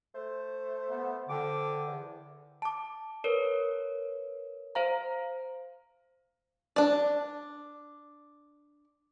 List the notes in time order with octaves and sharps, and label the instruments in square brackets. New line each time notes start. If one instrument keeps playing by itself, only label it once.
[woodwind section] A3 C5
[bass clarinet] B3
[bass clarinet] D3 [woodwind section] F3 G5 D6
[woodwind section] E2
[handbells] A5 D6
A#4 B4 C#5
C5 F5 A#5
[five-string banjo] D4 D5